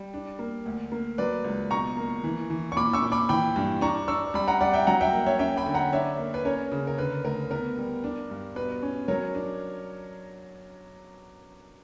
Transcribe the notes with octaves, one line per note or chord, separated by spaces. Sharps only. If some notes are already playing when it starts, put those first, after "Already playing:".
Already playing: G3
D4
A#3
D2
A#3
F#3 B4 D5
C#2
B2 A#5 C#6
A#3
E3
E3
C#6
A#2 B5 D6
C#6 E6
A#2
B5 D6
E3 G5 B5
G2
D4 A#5 C#6
D4 C#6 E6
G3 B5
F#5 A#5
G3 D5 F#5
E5 G5
F#3 F#5 A#5
E5 G5
A#3
C#5 E5
C#4 E5 G5
G5 B5
D3
F#5 A#5
D4 C#5 E5
A#3
B4
C#4 A#4 C#5
C#3
A#4
D3 B4
D2 A#4
B3 A#4
G3
D4
G2
B2 B4
C#4
F#3 A#4 C#5
D4